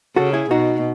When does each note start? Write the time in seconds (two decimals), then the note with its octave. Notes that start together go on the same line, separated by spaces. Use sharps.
0.16 C#3 F#4 A4
0.33 E4 G#4
0.50 B2 D#4 F#4